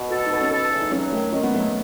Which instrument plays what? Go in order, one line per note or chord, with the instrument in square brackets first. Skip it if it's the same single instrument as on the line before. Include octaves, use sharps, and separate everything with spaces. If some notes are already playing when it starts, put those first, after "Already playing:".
Already playing: [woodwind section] B2
[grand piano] F#4 [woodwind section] A4
[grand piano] D#4
[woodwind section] B2
[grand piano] C#4
[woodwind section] A4
E2
[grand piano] D#4
[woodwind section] F#3 [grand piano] C#4
[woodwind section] D#3 [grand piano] A3
[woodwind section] D#3 [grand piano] C#4
[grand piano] B3
[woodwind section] F#3 [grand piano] A3
[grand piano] B3